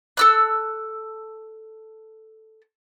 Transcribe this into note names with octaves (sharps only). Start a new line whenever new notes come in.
A4 E6 F#6